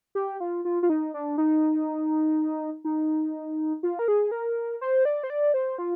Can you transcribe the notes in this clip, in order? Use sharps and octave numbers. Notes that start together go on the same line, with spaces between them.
G4
F4
F4
F4
D#4
D4
D#4
D#4
F4
A#4
G#4
A#4
C5
D5
C5
D5
C5
F4